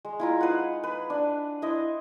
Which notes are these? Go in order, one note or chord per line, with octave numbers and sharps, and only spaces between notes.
G#3
E4 F4 A#5
D#4 B4 F5 F#5
B4
D4
E4 C5 D#5